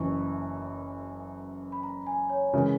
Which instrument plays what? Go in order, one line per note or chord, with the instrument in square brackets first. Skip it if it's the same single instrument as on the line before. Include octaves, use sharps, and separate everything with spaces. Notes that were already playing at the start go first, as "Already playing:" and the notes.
Already playing: [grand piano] F#1 F#2 E3 [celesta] C#6
[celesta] B5
A#5
G#5
C#5
[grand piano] C#3 E3 G#3 [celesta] A#4